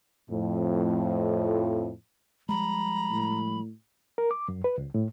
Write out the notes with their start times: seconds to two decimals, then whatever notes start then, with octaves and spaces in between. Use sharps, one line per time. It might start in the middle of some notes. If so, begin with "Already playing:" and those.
0.30 F2 A2
2.49 F3 G3 G#3 A#5 B5
3.11 A2
4.18 A#4
4.31 D6
4.48 F#2
4.64 B4
4.78 C#2
4.94 A2